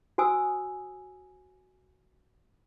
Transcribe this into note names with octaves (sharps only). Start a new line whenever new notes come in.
F#4 C5 G#5 D#6 E6